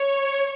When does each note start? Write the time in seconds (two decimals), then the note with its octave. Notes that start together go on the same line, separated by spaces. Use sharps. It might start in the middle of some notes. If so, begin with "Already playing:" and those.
Already playing: C#5